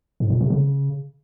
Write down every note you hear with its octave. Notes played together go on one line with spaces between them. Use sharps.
G#2
A#2
C3
C#3